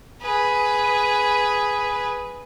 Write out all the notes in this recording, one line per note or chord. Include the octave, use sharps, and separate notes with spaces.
G#4 B4